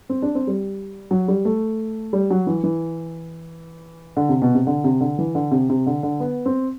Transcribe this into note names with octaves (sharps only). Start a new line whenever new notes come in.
C4
D4
C4
G3
F#3
G3
A3
G3
F#3
E3
E3
D3
C3
B2
C3
D3
C3
D3
E3
D3
C3
C3
D3
D3
B3
C4